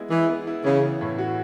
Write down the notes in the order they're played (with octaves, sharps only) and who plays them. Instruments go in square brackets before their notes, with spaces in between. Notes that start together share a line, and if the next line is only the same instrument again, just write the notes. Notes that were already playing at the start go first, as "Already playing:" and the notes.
Already playing: [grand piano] G#3 B3 E4
[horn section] E3 [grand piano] G#4
[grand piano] B3
E4
[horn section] C#3 [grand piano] E3
[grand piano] B3
A2
F#4